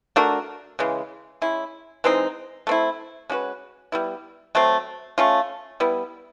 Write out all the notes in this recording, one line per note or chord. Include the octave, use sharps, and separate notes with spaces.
A3 D4 F#4 A#4
C#3 E3 G#3
G#3 C#4 E4
E3 G#3 C4 D#4
A3 C4 E4
G#3 C#4 F#4 B4
G3 B3 E4
F#3 A3 C4
A3 C#4 F4
G3 B3 E4